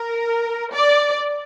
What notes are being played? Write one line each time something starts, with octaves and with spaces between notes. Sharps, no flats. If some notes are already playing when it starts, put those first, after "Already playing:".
Already playing: A#4
D5